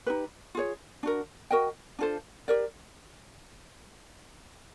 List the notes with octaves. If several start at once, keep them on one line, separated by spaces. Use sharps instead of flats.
D#4 G4 B4
F4 G#4 C#5
D4 F#4 A#4
F#4 A#4 D#5 G5
D4 F4 A4 C5
G4 A#4 D5